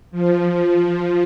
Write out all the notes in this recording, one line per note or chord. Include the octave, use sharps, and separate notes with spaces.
F3